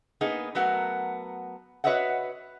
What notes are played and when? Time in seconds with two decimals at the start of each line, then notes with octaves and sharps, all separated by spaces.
0.21 A#3 B3 D#4 G#4
0.55 F#3 A3 B3 F#4 A#4 F#5
1.84 F#4 B4 C#5 D#5 E5 F#5